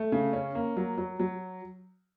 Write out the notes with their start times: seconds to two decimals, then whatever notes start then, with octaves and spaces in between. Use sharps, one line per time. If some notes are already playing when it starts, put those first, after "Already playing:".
Already playing: A3
0.12 C#3
0.33 C#4
0.55 A#3
0.77 F#3
0.98 F#3
1.19 F#3